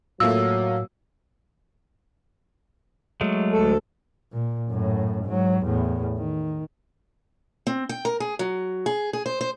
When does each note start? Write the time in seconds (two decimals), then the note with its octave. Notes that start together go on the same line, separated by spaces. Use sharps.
0.20 A2 F#3 A3 A#3 F4 E6
3.21 F#3 G#3 A3
3.53 D2 A4
4.33 A#2
4.69 F#2 A2
5.25 G#2 F#3
5.63 E2 A2
6.17 D#3
7.67 C4
7.89 G5
8.05 A#4
8.20 G#4
8.39 F#3
8.86 G#4
9.13 G#4
9.26 C5
9.41 C5